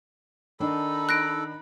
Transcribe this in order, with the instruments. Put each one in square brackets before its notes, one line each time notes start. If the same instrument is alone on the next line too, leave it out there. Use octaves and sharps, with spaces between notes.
[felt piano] D#3 D4 [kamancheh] D#4 B5 [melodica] A4
[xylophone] F#6 A#6 D7